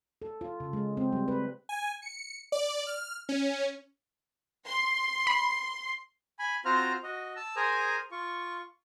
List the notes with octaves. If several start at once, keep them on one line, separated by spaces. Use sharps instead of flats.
A4
F4
C#3
G#3
C4
G3
B4
G#5
C#7
D5
F6
C#4
C6
B5
G#5 B5
C4 F4 F#4 C5 A#5 F6
F#4 D#5
A5 E6
G#4 A#4 C5 G#5 A#5 D#6
F4 C#6